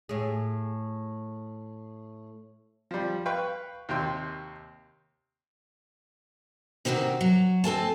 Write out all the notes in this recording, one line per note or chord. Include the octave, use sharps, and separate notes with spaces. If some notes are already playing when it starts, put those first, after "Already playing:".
A2 G#4
F3 G3
B4 F5 G5 B5 C#6
D#2 C3 G5 C6
C3 D#3 C4 F#4 G4
F#3
C4 A4 G#5 A5